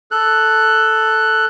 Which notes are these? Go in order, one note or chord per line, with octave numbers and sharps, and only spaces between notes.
A4 F#6